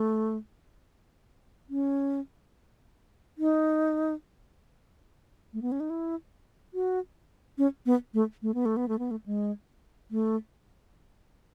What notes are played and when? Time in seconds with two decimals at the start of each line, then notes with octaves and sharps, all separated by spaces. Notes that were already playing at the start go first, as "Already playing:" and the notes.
Already playing: A3
1.70 C#4
3.38 D#4
5.53 A3
5.62 B3
5.72 C#4
5.80 D#4
5.90 E4
6.74 F#4
7.58 C#4
7.86 B3
8.14 A3
8.42 A3
8.54 B3
8.66 A3
8.77 B3
8.88 A3
8.99 B3
9.11 A3
9.26 G#3
10.11 A3